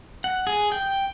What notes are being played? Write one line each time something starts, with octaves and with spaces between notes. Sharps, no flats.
F#5
G#4
G5